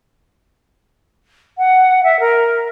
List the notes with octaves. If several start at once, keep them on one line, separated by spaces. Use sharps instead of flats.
F#5
E5
A#4